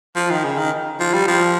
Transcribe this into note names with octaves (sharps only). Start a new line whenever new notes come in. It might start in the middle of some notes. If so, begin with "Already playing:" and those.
F3
D#3
C#3
D#3
F3
G3
F3